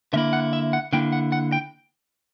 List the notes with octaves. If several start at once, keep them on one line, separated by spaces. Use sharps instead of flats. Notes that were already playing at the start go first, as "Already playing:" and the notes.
D3 A#3 E4 E5
F#5
E5
F#5
D3 A#3 E4 G5
F#5
F#5
G5